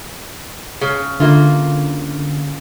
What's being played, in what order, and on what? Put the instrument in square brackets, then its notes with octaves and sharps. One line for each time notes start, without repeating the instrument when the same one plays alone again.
[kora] C#3
[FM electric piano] D3 [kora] A#3 E4 F4